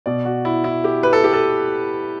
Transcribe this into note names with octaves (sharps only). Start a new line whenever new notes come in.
B2 D5
F#4
E4
E4
G4
B4
A4
G4
A4